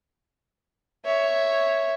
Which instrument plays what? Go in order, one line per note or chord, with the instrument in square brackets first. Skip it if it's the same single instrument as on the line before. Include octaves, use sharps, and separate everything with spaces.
[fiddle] C#5 E5